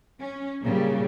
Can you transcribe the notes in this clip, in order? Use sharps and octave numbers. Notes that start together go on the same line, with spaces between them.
C#4
A#2 C#3 G3